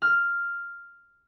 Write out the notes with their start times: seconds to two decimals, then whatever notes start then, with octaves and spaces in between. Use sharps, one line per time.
0.02 F6